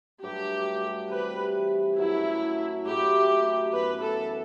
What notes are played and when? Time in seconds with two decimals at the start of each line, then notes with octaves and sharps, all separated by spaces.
0.22 G2 F#3 A3 G4
1.09 C3 E3 G3 B4
1.98 F#2 F#3 A3 E4
2.85 A2 F#3 A3 E4 G4
3.73 F#2 E3 B3 B4
4.02 A4